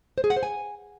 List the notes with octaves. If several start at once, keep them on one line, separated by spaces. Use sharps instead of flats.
C5
G#4
F#5
C5
G#5